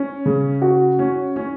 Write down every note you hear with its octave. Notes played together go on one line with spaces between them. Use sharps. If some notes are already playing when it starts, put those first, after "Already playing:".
Already playing: C#4
C#3
F#4
C#4
C#4